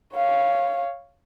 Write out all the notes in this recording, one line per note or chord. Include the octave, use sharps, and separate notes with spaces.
C#5 F5